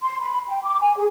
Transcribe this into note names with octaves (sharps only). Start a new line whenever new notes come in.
C6
B5
G5
D6
G#5
G#4